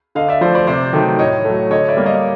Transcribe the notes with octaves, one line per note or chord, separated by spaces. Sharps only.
D3 D#5 F5
D5 E5
F3 A3 C5 D5
C5 D5
C3 C5 D5
D#3 F#3 A3
A2 C#5 D#5
A3
F#3
D3 C#5 D#5
D5 E5
G3 A#3
D#5 F5